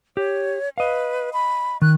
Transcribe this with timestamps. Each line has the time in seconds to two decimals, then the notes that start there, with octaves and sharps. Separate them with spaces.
0.17 G4 C#5
0.78 B4 D#5 F5
1.33 B5
1.82 D#3 F#6